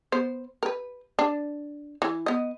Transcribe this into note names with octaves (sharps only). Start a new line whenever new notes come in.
B3 C5
A#4 B4
D4
E3
B3 D#5